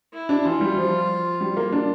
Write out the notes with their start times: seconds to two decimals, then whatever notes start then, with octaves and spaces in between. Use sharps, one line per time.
0.14 E4
0.29 D4
0.45 E3 F4
0.61 G3
0.77 F3
1.41 G3
1.57 A#3
1.72 D4